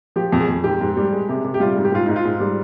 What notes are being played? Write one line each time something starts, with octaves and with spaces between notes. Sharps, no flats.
F3 G4
F2
G#4
F2
G#2 G4
G#2
G3
G#3
C3
C3
G4
G3 F4
G#2
G4
G#2 F4
G#2 D#4
F4
G#2
G3